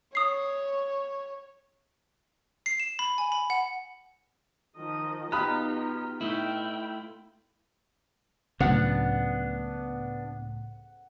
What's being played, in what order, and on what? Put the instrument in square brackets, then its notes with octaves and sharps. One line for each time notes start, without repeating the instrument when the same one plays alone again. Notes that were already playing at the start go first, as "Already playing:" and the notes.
[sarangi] C#5 [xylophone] D#6 C7
[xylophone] C7
E7
B5
G#5
B5
F#5
[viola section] D#3 F3 D#5
[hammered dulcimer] B2 F4 F5 [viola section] D#4 [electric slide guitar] G4 [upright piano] B5 D#6 F#6
[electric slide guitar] A3 E4 [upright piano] D#4 [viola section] G5
[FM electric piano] C#2 A2 [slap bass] C#3 F#3 [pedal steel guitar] B3 D4 [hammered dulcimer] F#5